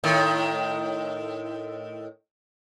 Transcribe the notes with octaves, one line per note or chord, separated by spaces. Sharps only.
A2 D#3